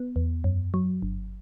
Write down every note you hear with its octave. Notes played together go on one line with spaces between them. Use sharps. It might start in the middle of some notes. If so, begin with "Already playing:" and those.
Already playing: B3
E2
F#2
F#3
G1